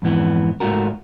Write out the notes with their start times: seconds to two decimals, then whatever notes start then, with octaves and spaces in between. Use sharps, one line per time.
0.02 F2 G#2 E3 B3
0.60 G#2 C#3 A3 F4 F#4 A#4